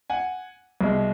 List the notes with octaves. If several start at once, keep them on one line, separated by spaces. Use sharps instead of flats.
F#5 G#5
C2 B2 G#3